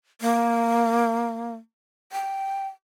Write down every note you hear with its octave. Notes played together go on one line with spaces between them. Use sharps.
A#3
G5